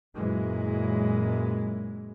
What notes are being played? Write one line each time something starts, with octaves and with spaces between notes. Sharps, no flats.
F#2 A#2 E3 F#3 G#3